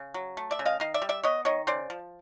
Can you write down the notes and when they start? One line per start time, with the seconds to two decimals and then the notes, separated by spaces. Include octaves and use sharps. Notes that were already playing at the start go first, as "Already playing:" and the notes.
Already playing: C#3
0.14 F#3
0.37 A3
0.51 D5 E5
0.59 C#3
0.65 D#5 F5
0.80 D#3 D#5 F5
0.94 D5 E5
1.02 G3
1.09 D5 E5
1.24 B3 C#5 D#5
1.45 D#3 C#5 D#5
1.67 C#3 C5 D5
1.90 F3